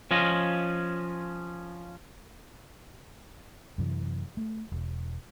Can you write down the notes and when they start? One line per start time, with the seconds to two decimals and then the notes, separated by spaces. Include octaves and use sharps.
0.11 F3 C#4 F4 D#5
3.78 F#2 C3 E3
4.37 A3
4.72 E1